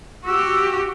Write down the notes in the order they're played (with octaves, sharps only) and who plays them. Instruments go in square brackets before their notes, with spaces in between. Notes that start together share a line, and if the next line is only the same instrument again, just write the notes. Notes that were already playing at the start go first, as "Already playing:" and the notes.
[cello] F#4 G4 [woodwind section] E6